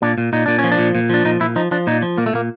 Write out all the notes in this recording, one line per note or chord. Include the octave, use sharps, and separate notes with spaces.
A#2 D4
A#2
A#2 D#4
A#2 D4
C#4
F3
D4
A#2
A#2
F3 D4
A#2 D#4
A#2 E4
F3 D#4
F3 D4
A#2 D#4
F3
A#2 A#3
A3
A#2 A#3